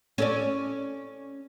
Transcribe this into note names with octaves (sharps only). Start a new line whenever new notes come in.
C#4 A4 D5